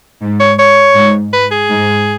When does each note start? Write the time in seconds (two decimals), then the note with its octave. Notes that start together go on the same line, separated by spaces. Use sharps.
0.22 G#2
0.40 C#5
0.59 C#5
0.96 G#2
1.33 B4
1.51 G#4
1.70 G#2